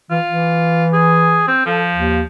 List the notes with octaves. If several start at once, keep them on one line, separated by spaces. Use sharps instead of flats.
E3 F4
E3
G#4
C4
F3 A4
D#2